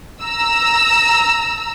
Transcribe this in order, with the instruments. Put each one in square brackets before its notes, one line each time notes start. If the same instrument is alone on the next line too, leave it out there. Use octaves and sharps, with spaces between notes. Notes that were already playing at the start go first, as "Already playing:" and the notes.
[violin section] A#5 E6